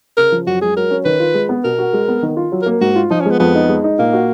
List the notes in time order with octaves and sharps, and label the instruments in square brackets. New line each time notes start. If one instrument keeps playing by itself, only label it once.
[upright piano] C#3 [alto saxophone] A#4
[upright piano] F3
[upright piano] F#2 [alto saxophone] F#4
[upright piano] G#3 [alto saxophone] G#4
[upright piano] F#3 [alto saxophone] A#4
[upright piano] C#4
[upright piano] D#3 [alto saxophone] B4
[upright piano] F4
G#3
B3
[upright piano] B2 [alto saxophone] A#4
[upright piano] F#4
G#3
B3
D#3
F4
F#3
[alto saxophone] A#4
[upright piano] A#3
[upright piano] G#2 [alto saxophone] F#4
[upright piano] F4
[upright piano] F3 [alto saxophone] D#4
[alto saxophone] C#4
[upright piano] G#3 [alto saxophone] B3
[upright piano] F2 [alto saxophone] B3
[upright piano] D#4
G#3
D#4
[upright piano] A#2 [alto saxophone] A#3
[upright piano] F#4